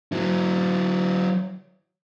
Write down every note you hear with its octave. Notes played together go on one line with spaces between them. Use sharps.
F#3 E4